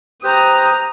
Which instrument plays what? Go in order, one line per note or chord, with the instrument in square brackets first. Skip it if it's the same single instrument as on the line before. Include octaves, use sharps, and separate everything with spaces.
[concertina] G4 B4 C5 [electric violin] A#5 D#6